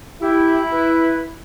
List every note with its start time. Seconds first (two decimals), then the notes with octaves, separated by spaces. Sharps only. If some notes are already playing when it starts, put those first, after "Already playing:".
0.21 E4 G4
0.71 B4